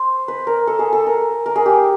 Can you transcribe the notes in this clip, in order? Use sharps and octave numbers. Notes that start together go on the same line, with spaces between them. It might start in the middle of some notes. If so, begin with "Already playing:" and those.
Already playing: C5
B4
A#4
A4
G#4
A4
A#4
A#4
G#4
G4